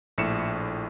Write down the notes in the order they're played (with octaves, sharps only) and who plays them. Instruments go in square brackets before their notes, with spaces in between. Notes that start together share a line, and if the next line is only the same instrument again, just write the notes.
[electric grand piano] A#1 A2 C#7 E7